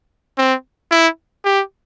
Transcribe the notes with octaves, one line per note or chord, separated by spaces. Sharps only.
C4
E4
G4